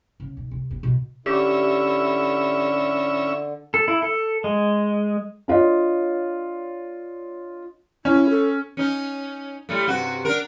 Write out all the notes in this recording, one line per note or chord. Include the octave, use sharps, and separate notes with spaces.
C#3
B1
C3
B3
B2
D3 C#4 E4 G4 E5
A4
E4
A4
G#3
D4 F4 C#5 D#5
C#4 E4
A4
C#4 D#4
A2 G3 A3
G2 C3 F#4
D4 A#4